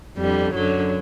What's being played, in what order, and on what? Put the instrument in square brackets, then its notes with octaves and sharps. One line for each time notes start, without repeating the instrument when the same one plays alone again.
[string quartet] F2 D3 G3
F#2 D3 F#3